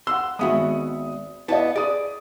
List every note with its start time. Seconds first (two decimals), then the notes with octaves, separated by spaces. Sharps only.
0.07 F#5 C6 E6
0.39 G#1 G#3 B3 F#4 E5 D#6
1.48 B3 E4 D5 D#5 A5
1.76 G#4 D5 D#6